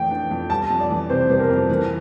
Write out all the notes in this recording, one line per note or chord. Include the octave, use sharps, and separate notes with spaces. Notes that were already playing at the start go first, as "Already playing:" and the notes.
Already playing: F2 E3 A3 G5
D4
F2
G3 A5
F2
D5
E3
C3 C5
G3 C5
A#4
F2
E3 A#4